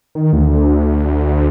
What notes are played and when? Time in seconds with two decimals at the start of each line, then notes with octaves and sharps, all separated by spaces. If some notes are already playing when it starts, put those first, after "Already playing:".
0.15 D#3
0.33 D2